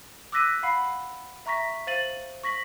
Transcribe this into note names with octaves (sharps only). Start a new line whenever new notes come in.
D6 E6 F#6 A#6 B6 D#7
F5 F#5 B5 C7
E5 A#5 C#6 A#6 B6
C5 F5 A6 D#7 F#7
C#6 A#6 B6 F#7